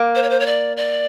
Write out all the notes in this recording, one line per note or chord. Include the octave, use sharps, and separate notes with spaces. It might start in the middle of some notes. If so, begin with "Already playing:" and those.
Already playing: A#3
C5
C#5
C5
C#5
D5
D5